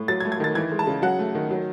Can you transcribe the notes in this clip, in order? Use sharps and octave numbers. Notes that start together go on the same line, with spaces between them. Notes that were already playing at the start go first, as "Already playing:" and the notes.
Already playing: A2
F#3 A6
G#6
A3
G#6
D#3 A6
E3 G#6
G#3
A5
C#3
F#3 F#5
A3
D#3
F#3